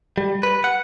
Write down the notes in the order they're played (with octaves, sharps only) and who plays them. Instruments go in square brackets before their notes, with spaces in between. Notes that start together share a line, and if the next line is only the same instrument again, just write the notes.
[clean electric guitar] G3
B4
F#5